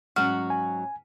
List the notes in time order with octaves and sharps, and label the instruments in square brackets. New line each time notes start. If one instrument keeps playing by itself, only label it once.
[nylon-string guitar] G#2 F#3 C#4 [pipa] F#4 [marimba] F6
[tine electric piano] G#5